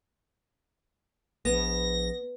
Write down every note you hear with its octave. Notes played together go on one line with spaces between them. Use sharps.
A#1 B3 A#6